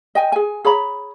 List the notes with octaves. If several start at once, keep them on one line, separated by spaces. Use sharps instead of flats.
D#5 G5 G#5
G#4 G#5
G#4 C#5 A#5 B5